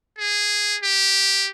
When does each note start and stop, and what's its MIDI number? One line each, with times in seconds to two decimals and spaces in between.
0.19 0.78 68
0.83 1.50 67